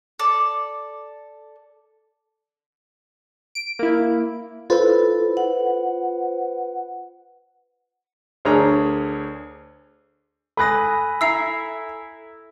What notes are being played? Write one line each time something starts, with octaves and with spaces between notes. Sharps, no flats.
A4 D5
D7
A#3 E4
E4 F4 A4 B4 C5
F#5
D2 D4 G#4 A#4 C#5 A#5
A4 G#5 B5 D#6 F#6 A#6
E4 E5 A#5 E6 C7